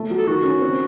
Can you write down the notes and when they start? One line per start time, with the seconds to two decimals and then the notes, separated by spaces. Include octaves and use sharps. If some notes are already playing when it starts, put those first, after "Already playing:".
Already playing: A3
0.10 F#3
0.17 A4
0.27 D#3 F#4
0.44 C#4
0.62 C4